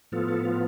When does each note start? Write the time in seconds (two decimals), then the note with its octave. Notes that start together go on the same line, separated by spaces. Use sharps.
0.12 A2 F3 B3 F4 A4
0.29 A4
0.45 F4